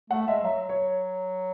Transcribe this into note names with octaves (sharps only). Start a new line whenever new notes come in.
A3 F#5
G#3 E5
F#3 E5
C#5